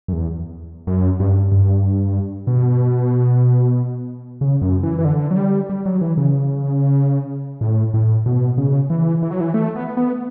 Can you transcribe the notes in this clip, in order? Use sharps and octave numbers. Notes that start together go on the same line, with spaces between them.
F#2
E2
F#2
G2
G2
B2
C#3
F#2
E3
E3
D3
F#3
G3
G3
F#3
E3
C#3
A2
A2
B2
C#3
E3
E3
F#3
E3
A3
B3
B3